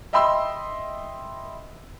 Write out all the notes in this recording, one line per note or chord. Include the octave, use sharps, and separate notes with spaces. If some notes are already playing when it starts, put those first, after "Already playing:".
D#5 E5 G5 B5 C6 E6